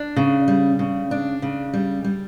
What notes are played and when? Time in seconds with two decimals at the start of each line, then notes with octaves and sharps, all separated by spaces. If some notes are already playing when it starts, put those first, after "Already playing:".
Already playing: D4
0.16 C#3
0.48 G3
0.79 C#3
1.11 D4
1.42 C#3
1.73 G3
2.04 G3